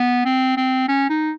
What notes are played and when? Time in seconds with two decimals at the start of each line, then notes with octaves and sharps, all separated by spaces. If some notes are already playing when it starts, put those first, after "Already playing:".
Already playing: B3
0.25 C4
0.57 C4
0.88 C#4
1.10 D#4